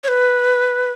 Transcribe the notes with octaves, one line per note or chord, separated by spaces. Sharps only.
C#5
B4